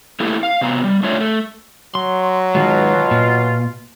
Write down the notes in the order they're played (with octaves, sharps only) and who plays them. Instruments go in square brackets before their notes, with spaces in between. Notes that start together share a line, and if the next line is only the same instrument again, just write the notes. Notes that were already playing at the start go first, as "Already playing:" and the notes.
[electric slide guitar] A3 A#3 E4 G4
F5
C3 B3 A#5
G3
A3 D4 F4 C#5 E5
A3
[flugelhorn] F#3 [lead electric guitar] C6
[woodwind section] B2 F4 [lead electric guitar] D#3 G#3
[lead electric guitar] A#2